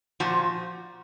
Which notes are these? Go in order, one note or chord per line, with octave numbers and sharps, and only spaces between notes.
A#2 F3 F#4